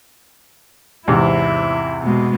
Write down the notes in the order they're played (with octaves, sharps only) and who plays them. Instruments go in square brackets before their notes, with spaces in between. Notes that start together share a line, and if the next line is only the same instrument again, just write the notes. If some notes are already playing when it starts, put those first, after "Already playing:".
[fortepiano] E2 G#2 C3 [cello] E4
[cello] B2 G#3